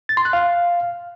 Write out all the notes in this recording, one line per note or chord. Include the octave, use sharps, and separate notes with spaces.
A6
C6
F#6
F5